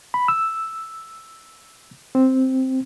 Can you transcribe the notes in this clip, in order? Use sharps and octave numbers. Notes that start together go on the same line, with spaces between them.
B5
E6
C4